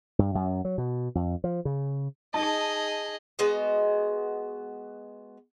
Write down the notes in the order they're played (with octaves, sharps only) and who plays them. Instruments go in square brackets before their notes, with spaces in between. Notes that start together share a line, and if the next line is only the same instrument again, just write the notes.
[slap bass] G2
F#2
F#3
B2
F2
F3
C#3
[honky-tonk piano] D#4 A5 [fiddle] G#4 D#5
[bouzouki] G#3 B3 F#4 D#5